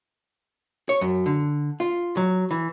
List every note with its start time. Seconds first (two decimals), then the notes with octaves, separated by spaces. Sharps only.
0.89 C#5
1.01 F#2
1.26 D3
1.80 F4
2.17 F#3
2.51 E3